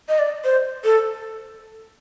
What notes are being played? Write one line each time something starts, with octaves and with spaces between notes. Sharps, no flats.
D#5
D5
C5
A4